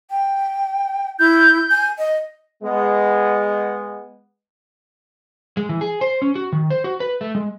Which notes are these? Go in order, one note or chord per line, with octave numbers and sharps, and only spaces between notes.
G5
E4 G6
G#5
D#5
G#3 B3
G#3
E3
G#4
C5
C#4
F#4
D#3
C5
F#4
B4
A3
G#3